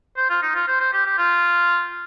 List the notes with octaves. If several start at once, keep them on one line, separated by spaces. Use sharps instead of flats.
C5
F4
D#4
F4
C5
C5
G4
G4
F4